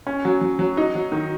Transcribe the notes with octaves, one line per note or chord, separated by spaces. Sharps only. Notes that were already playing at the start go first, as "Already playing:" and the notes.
C#4
F#3
F#3
F#3
D#4
F#3
D#3